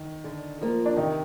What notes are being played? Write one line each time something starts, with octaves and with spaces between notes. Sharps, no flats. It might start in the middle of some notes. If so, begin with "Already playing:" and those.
Already playing: D#3
D3
F3 A#3 F4
D4
C3 D#3 D#4